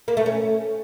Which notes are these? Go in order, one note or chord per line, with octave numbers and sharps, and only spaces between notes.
A#3
A3
C#4